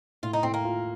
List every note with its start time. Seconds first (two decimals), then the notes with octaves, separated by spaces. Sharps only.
0.23 A2 F4
0.33 D#4
0.43 A2 C4
0.54 A#3
0.65 F4